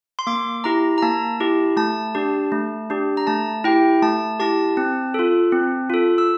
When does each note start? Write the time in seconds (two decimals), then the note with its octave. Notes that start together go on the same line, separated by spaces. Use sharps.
0.19 C6
0.27 A#3 D6
0.64 E4 G4 A#5
0.98 A#5
1.02 A#3 A5
1.40 E4 G4
1.77 A3 A5
2.15 D4 G4
2.52 A3
2.90 D4 G4
3.17 A#5
3.27 A3 A5
3.64 E4 G4 G5
4.02 A3 A5
4.40 E4 G4 A5
4.77 C4
5.14 F4 A4
5.52 C4
5.90 F4 A4
6.18 E6